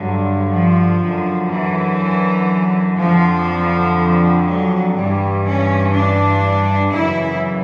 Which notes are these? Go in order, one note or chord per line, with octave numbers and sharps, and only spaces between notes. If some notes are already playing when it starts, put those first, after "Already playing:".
Already playing: G2 D3 F#3
F3
F#2 D3
E3
F2 D3 F3
F#3
G2 E3 G3
C#4
D4
F#2 C#3 E3 E4